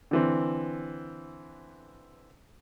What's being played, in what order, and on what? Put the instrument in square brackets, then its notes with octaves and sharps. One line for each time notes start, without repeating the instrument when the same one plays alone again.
[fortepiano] D3 E3 C4